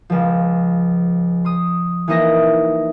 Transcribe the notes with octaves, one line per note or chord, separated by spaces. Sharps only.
C#2 F3
C6 D#6
E3 A#3 D#4 D#5 E5 A#6